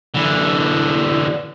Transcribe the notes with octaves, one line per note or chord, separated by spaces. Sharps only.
D3 E3